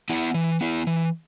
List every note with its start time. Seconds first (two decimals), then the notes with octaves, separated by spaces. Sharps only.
0.10 B3 E4
0.34 E3
0.61 B3 E4
0.87 E3